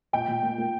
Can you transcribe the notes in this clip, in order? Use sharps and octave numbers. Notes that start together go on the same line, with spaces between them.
A#2 G5
A#2
A#3
A#3